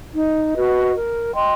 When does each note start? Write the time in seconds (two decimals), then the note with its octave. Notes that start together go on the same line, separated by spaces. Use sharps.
0.14 D#4
0.54 F#4 B4 D#5
0.94 A#4
1.34 D#5 G5 C6